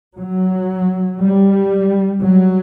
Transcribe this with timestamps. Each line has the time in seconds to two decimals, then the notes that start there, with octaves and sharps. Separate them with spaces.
0.18 F#3
1.20 G3
2.23 F#3